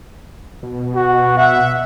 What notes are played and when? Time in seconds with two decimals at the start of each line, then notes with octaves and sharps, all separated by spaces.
0.63 B2
0.95 F#4
1.38 E5 F#5